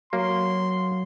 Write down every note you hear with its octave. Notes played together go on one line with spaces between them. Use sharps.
F#3 A#3 C6